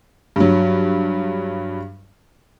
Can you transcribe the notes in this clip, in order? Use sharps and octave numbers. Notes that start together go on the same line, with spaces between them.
G2 F#3